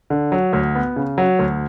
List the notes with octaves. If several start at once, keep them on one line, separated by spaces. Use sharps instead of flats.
D3
F#3
D2
B3
C#3
F#3
D2